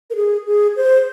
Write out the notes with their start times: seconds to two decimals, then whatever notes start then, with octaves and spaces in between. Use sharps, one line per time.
0.10 A#4
0.16 G#4
0.46 G#4
0.76 C5